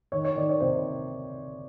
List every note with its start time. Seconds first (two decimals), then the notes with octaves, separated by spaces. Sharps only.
0.12 D#3 C#5
0.25 C#5
0.36 D#3 D5
0.49 C#5
0.60 C3 C5